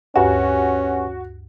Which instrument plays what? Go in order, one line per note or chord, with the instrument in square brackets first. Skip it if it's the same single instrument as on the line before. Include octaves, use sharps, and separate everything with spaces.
[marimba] D2 G2 E5 [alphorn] C#4 [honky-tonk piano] F#4 [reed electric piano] G4 B4 G#5